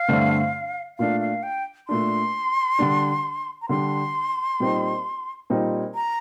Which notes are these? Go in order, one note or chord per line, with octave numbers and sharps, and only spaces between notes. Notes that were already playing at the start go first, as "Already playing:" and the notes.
Already playing: F5
G2 D3 A3 C4
A#2 A3 D4 F5
F5
G5
A#2 A3 D4 C6
D3 G3 D4
A#5
D3 G3 D4 C6
A#2 G3 C4 D#4
A#2 G3 C4 D#4
A#5